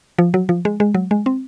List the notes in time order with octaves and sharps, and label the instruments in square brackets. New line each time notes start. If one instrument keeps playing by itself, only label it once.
[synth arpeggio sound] F3
F#3
F3
G#3
G#3
F#3
G#3
C4